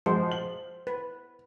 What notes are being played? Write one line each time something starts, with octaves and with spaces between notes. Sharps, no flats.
F3 G#3 F#4 C5
F#7
B4